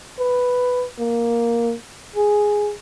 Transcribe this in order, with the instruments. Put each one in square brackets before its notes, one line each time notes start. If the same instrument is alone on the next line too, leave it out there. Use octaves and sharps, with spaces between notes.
[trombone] B4
A#3
G#4